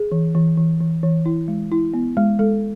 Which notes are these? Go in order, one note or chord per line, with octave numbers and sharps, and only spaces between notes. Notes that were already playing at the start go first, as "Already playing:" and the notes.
Already playing: G#4
E3
E3
E3
E3
E3
E4
G#3
E4
B3
G#3
G#3 A4